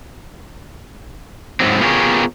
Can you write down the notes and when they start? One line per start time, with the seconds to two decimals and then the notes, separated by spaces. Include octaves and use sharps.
1.60 G#2 F3 F#3 C4
1.81 B3 F4 G4 G#4 A#4 C#5